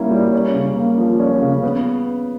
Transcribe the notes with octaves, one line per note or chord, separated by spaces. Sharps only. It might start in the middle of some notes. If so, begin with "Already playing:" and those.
Already playing: G3 A#3 C#4 E4
G3
C#4
C#3
A#3
F3
C#4
C#3
B3